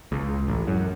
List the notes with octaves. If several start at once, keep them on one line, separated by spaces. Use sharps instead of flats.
C#2
A1
F#2